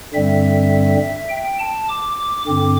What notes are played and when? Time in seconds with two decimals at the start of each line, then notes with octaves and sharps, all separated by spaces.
0.14 G2 D3 G3 C4 E5
1.29 G5
1.59 A5
1.88 D6
2.46 G2 D3 C4 D6